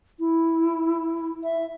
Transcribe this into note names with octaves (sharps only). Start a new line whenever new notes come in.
E4
E5